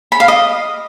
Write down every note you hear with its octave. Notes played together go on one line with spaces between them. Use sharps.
B5
F5
D#5